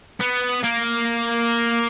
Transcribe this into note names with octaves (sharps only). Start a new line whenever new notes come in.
B3
A#3